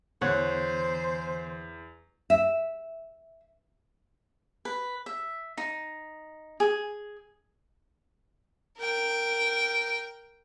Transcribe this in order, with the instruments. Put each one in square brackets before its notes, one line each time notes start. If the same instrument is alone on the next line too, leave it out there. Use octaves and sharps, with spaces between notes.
[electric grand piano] E2 [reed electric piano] D3 E3 B3 [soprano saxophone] C5 [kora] C#5 F#5
[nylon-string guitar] E5
[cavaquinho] B4
E5
D#4
G#4
[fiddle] A#4 G5